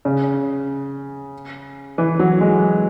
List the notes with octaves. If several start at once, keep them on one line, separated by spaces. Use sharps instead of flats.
C#3
E3
F#3
G#3